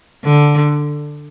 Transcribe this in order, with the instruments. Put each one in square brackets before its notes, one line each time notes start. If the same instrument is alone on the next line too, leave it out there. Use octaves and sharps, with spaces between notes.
[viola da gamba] D3